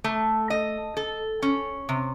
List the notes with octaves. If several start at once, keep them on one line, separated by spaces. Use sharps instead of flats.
A3
D#5
A4
C#4
C3